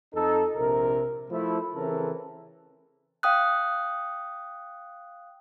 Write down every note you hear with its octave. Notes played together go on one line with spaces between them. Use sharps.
F2 D#4 A4
A#1 C3 A#4
F3 A3 E4
C#3 E3 C4 A4 A#4
F5 G5 D#6 F#6